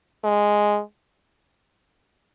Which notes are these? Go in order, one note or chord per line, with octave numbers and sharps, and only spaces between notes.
G#3